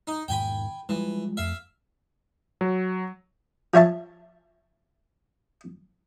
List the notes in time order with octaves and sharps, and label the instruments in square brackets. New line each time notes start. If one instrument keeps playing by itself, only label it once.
[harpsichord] D#4
[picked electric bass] E1 G#2 D#3 [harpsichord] G5 G#5 B5
[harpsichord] E3 [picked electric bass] F3 G3 G#3
[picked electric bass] F2 A3 [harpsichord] E5 F5
[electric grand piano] F#3
[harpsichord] F3 C#5 E5 A5